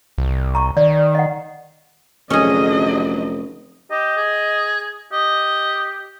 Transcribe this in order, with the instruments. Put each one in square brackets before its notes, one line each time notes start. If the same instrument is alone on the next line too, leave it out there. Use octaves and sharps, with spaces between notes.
[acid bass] C2
[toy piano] A#5 C#6
[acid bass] D#3 [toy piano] D5
[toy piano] D#5 F#5
[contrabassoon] F1 [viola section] D3 F#3 D#5 [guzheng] C#4 G#4
[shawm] G4 [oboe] D#5
[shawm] G#4
[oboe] G4 [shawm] D#5